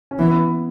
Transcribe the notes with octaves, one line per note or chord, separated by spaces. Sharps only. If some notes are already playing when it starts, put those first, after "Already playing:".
C#4
E3 B3